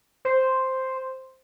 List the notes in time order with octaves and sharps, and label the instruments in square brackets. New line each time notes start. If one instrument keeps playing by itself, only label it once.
[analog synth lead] C5